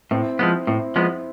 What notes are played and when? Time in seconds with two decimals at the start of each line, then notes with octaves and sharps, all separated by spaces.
0.11 A2 C4 E4
0.39 F3 G#3 B3
0.67 A2 C4 E4
0.96 F3 G#3 B3